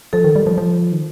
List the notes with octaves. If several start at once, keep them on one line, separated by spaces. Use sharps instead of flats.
F3 A4
D#3
G3
F3
F3
D#3